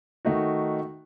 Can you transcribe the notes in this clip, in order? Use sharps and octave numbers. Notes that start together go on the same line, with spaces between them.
D#3 A3 D#4 F#4